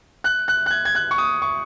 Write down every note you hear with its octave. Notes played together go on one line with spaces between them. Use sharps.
F#6
F#6
F#6
G#6
G#6
F#6
C#6
D#6
C#6